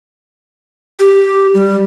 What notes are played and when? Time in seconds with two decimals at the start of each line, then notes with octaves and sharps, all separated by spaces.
0.99 G4
1.54 G3